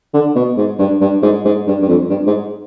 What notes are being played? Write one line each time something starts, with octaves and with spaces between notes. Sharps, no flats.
D3
B2
G#2
G2
G2
G#2
G#2
G2
G2
F2
G2
G#2